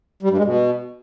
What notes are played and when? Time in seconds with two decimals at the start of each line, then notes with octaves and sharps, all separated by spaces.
0.23 G3
0.30 G2
0.37 G#3
0.45 B2